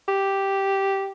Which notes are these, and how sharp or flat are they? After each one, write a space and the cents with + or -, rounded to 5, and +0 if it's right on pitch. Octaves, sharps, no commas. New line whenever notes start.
G4 -5